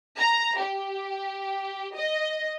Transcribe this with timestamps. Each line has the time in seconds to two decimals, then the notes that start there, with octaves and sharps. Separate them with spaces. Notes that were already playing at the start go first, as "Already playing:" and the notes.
0.18 A#5
0.58 G4
1.95 D#5